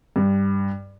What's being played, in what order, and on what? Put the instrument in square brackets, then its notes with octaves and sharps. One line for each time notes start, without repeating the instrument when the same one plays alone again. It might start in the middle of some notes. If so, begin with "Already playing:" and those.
[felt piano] G2